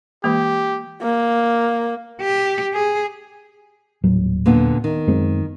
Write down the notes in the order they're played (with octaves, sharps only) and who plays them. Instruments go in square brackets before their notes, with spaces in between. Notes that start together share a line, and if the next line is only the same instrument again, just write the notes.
[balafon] E3 G#3 A#3 [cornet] G4
[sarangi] A#3
[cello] G4
G#4
[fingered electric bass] D#1 A2 F#3
[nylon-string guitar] A#2 D3 B3
D#3
[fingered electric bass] F#2 G#3 C4